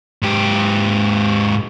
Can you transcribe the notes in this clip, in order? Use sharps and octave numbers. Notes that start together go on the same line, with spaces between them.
G#2 G4